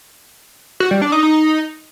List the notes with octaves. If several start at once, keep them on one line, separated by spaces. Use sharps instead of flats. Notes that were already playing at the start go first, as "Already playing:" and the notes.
F#4
G3
D4
D#4
D#4